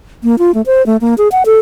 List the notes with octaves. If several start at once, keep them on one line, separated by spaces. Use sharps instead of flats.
A#3
F4
A3
C5
A3
A#3
G#4
F#5
A4